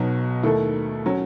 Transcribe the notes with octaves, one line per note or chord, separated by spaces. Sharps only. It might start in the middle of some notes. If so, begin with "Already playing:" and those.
Already playing: B1 B2 F#3
D#2 D#3 A3 E4 A4
F#3 C#4